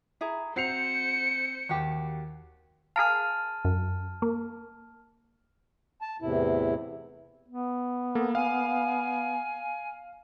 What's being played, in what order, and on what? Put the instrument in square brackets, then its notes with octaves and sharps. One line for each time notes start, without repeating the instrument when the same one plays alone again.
[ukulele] E4 G#4 A#5
[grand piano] C4 C7 F7 [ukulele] F#4 [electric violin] C5 C#7
[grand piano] D#2 [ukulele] F#4 G4
[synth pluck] G#4 A#4 F5 [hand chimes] A5 F6
[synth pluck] F#2
A#3
[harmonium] A5
E2 A2 C3 E4
[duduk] B3
[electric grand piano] A#3 A4
[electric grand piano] F5 [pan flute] G#5